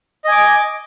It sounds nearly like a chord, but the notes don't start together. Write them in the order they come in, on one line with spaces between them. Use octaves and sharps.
D#5 G#5 D6